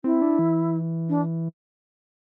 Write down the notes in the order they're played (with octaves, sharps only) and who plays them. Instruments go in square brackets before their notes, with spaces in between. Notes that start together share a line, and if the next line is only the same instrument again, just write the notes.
[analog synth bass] C4 [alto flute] E4
[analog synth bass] D4
E3
[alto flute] D4